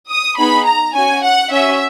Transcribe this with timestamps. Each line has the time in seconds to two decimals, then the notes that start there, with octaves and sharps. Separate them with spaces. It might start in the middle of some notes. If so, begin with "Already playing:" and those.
0.09 D#6
0.38 B3 D#4 G#4 B5
0.66 A#5
0.94 C#4 F#4 G#5
1.24 F#5
1.51 C#4 F#4 E5